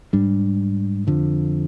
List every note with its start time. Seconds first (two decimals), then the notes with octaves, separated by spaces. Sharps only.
0.13 G#2 G3 D4
1.07 F2 D3 F3